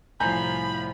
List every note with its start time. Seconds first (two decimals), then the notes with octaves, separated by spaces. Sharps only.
0.20 C2 A2 F3 G#5 A#5 B5 G6